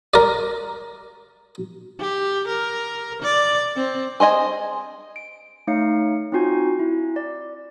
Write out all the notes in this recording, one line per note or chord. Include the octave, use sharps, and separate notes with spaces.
A#4 D5
G4
A#4
D5
C4
G#4 C5 D#5 G#5
D7
A3 D#4 C#5 F5 C#7
C4 D#4 F4 F#4 G#5 G#6
E4
D5